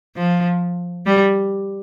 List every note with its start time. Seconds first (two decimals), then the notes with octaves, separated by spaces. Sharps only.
0.16 F3
1.06 G3